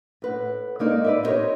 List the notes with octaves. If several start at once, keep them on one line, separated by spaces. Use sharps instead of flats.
A2 B4 F#5
G#3 A#3 D#4 A#4 D5
B4 D5 E5
B3 C4 D#4 G4 A#4 C#5